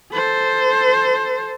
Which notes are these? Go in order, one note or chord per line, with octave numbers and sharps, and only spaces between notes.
A4 C5